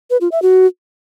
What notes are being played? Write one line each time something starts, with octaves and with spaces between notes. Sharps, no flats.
B4
F4
E5
F#4